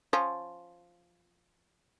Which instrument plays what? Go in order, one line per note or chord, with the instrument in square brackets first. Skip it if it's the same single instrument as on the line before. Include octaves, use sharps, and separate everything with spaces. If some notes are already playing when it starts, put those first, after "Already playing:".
[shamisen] F3 C#4